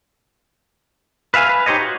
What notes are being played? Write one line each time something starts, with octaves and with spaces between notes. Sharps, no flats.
B4 E5 F5 G#5
B4
D#4 G4 C5 C#5 D#5
F#4